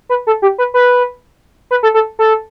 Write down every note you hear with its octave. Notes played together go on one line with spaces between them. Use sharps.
B4
A4
G4
B4
B4
B4
A4
A4
A4